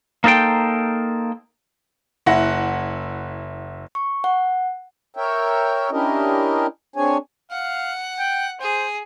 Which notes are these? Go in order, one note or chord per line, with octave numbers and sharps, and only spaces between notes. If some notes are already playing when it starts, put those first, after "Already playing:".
A#3 D#4 A4 C5 G5
F#1 E4 F#5 A#6
C#6
F#5
A#4 C#5 E5 G5
C#4 D4 E4 G4 A#4 D#5
C4 D4 G#4 C#5 G#5
F5 F#5
G5
G#4 C5